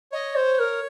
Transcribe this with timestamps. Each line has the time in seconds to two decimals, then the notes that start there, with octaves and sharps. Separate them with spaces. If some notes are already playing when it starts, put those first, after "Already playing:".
0.12 C#5 D#5
0.35 C5
0.59 A#4